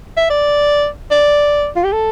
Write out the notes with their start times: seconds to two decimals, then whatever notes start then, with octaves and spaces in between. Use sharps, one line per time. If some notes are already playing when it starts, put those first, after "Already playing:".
0.17 E5
0.30 D5
1.11 D5
1.76 F4
1.84 G4
1.93 A4